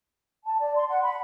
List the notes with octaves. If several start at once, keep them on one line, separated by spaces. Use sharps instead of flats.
A5
D5
C6
F#5
B5